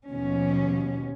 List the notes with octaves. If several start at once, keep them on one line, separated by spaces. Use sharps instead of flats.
D#2 B2 F3 C#4